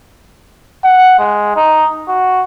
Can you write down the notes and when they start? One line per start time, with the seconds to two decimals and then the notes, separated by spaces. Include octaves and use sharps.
0.84 F#5
1.19 G#3
1.57 D#4
2.08 F#4